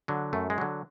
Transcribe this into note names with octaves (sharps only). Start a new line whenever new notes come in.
D3 F#3
F#2 A3
G#3
D3 F#3